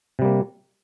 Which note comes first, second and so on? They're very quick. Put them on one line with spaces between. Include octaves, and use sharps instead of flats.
C3 G3 A#3